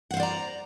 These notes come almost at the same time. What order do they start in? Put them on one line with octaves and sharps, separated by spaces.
F#5 C5 F5 D5 A#5